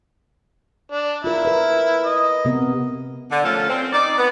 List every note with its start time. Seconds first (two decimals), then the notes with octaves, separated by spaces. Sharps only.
0.92 D4
1.24 E4 F4 A#4
1.45 A#4 B4
2.05 D#5
2.45 C3 B3 A#4
3.31 D3
3.44 F3 A3 C#4 F4 A4 A#4
3.70 C4
3.93 D#4 D5
4.18 B3